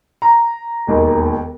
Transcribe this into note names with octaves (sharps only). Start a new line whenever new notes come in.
A#5
E1 D#2 D#3